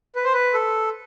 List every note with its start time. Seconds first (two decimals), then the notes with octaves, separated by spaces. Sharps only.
0.16 B4
0.24 C5
0.33 B4
0.54 A4